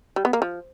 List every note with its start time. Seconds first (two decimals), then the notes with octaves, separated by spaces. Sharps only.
0.16 G3
0.25 B3
0.33 A#3
0.42 F3